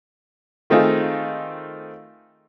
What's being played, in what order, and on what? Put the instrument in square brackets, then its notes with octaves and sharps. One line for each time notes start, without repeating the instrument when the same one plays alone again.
[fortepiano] D#3 A3 C4 D#4 F4 G#4